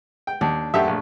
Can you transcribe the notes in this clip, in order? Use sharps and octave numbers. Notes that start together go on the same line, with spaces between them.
G5
D#2 D4
F#2 A3 G4 E5
A#1